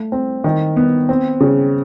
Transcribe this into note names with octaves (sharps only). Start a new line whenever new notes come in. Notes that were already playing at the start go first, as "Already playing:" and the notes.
Already playing: A3
C4
D#3
B3
C4
C#3